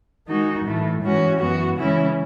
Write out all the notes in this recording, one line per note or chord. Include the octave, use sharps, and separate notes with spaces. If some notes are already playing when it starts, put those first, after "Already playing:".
D#3 G#3 D#4 F#4
A2 E3 A3
G#2 E3 G#3 C#4 F#4
F#2 E3 B3 F#4
C#3 E3 G#3 C#4 E4